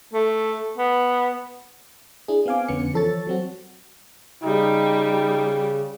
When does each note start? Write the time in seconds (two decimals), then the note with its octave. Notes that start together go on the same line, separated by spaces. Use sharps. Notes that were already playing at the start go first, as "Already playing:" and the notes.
0.14 A3
0.78 B3
2.28 D4 E4 G#4
2.46 B3 C4 F5 G#5 D6
2.68 F2 D3 B3 C#4 C#7
2.94 E3 F3 A4 C#5 A6
3.27 F#3 C4 F#4
4.43 C#3 G3 D#4 G4 G5